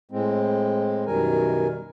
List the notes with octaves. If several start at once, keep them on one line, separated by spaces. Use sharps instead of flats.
A2 G#3 C4
F#2 B2 D#3 G3 A#4 G#5